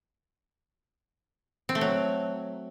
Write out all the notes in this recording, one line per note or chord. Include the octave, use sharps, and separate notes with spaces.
C4
A3
F#3